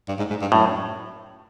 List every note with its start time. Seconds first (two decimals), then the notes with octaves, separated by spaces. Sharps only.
0.08 G2
0.19 G#2
0.30 G#2
0.41 G2
0.52 F#2 A2